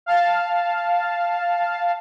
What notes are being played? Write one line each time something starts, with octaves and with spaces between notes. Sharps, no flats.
F5 A5